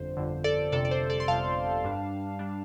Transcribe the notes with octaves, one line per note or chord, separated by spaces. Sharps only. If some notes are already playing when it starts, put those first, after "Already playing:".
Already playing: G1 F2 D3 C5
G1 F2 D3
A4 D5
G1 F2 C3 A4 D5
D5
C5
A4 D5
C6
G1 F2 C3 F5 A5
G2 G3 D4
G3 D4